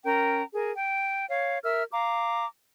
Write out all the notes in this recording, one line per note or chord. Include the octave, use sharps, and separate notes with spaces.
C#4 A#4 G5 A#5
G#4 A#4
G5
C#5 F5
A#4 E5 E6 F6
F5 A#5 D6